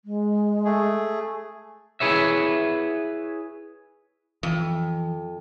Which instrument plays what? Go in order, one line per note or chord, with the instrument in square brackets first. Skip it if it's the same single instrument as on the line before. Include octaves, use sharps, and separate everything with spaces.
[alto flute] G#3
[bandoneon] A3 G#4
[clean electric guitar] E4 G#4 B4 C#5 E5
[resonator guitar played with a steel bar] F2 [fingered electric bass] E3